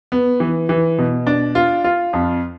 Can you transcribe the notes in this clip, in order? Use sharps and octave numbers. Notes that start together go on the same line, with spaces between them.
B3
E3
E3
B2
D4
F4
F4
F2